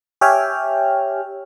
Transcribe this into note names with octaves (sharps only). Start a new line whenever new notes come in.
G4 C#5 E5 G5 G#5 F6